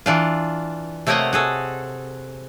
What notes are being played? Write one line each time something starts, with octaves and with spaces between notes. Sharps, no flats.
E3 D4 F4
C3 A3 A#3 C#5 D#5 F#5
F#4 G#4 A4